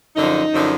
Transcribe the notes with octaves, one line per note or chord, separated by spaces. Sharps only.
F#2 D3 F3 D#4
F#2 D3 F3